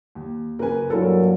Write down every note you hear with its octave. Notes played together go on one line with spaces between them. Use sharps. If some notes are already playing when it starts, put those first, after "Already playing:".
D#2
F#1 A#4 B4 G#5
G2 A#2 F#3 E4 A4 A#4